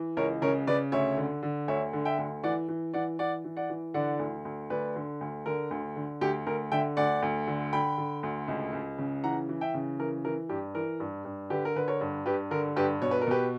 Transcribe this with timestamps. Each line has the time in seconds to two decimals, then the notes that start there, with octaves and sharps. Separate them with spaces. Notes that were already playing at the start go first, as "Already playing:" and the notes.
Already playing: E3
0.17 C#2 A#4 C#5
0.42 C#3 A#4 C#5
0.67 C#3 B4 D5
0.92 D2 C#5 E5
1.17 D3
1.43 D3
1.68 D2 C#5 E5
1.93 D3
2.05 E5 G5
2.18 D2
2.44 E3 D5 F#5
2.69 E3
2.94 E3 D5 F#5
3.19 E3 D5 F#5
3.44 E3
3.57 D5 F#5
3.70 E3
3.94 D3 D5 F#5
4.19 D2
4.45 D2
4.70 D2 B4 D5
4.96 D3
5.21 D2
5.46 D3 A#4
5.71 D2
5.96 D3
6.21 D2 G4
6.47 D2 A#4
6.72 D3 E5 G5
6.97 D2 D5 F#5
7.22 D2
7.47 D3
7.73 D3 G5 B5
7.98 D3
8.23 D2
8.48 C#2
8.73 C#2
8.98 C#3
9.23 E3 F#5 A#5
9.49 E3
9.61 E5 G5
9.74 C#3
9.99 E3 A#4
10.25 E3 A#4
10.49 G2 G4
10.75 E3 A#4
11.00 G2
11.25 G2
11.50 D3 G4 B4
11.65 A#4
11.75 D3 B4
11.88 A#4 C#5
12.01 G2
12.26 G2 G4 B4
12.51 D3 A#4
12.76 G2 G4 B4
13.01 B2 C#5
13.11 B4
13.21 A#4
13.27 B2 G4 B4